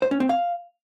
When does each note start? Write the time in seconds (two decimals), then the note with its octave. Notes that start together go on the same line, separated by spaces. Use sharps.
0.02 C5
0.11 C#4
0.20 C4
0.29 F5